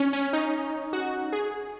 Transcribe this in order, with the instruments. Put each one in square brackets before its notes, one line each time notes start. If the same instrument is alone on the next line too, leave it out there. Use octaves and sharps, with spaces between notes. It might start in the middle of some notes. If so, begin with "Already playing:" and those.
Already playing: [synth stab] C#4
C#4
D#4
F#4
G#4